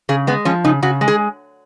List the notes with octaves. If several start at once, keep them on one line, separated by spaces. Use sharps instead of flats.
C#3 G#4
G#3 B3
F3 C#4
C#3 D#4
C#3 F#4
G#3
G#4